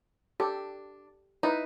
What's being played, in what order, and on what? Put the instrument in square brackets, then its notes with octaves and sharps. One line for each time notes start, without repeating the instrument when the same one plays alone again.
[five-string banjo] D4 [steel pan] G4 A4
[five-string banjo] D#4 [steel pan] E4 B4